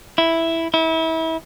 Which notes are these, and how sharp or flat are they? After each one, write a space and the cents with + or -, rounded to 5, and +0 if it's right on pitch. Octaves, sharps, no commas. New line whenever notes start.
E4 +0
E4 -30